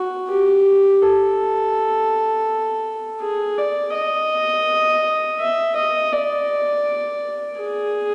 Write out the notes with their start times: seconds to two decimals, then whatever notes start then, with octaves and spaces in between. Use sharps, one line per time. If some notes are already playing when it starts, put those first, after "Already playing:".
Already playing: F#4
0.29 G4
1.02 A4
3.21 G#4
3.58 D5
3.94 D#5
5.40 E5
5.76 D#5
6.12 D5
7.59 G#4